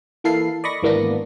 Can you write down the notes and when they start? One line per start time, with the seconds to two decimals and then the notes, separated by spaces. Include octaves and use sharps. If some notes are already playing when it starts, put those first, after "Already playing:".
0.24 E3 A#3 E4 A4 F5 C7
0.64 D5 D#5 B5 C#6 A#6
0.83 G#1 E3 A#3 B3 D4 A#6